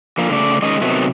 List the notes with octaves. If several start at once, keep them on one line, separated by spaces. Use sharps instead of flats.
D3 F3 A#3
C#3 A3 D5
D#3 G#3 C#4 D#5
C3 D#3 F#3 A3 B3